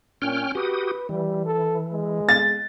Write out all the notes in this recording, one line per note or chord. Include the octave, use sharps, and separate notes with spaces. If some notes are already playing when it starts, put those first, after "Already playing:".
A#2 C#4 G5 F6
F#4 G4 B4 D#6
E3 G3
A4
G#3
A6